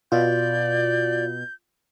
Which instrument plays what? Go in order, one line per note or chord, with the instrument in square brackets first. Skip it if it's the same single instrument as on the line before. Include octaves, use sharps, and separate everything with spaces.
[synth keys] B2 [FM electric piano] F4 [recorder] D5 [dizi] G6